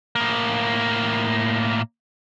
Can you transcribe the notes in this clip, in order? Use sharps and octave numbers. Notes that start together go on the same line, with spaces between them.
A2 A#3